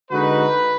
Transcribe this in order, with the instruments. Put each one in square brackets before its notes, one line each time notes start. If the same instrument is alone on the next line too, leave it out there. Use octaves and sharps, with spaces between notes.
[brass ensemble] D3 G#3 D#4 F#4 [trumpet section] B4